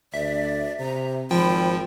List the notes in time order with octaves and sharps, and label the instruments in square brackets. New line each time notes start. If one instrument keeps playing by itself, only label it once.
[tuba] D2 [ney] D5 [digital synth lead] E5
[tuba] C3 [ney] A#5
[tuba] G#1 [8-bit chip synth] F3 [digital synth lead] G5 [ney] B5